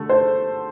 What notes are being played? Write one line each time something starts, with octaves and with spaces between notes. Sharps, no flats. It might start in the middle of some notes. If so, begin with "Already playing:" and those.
Already playing: D3 A3 A4
C5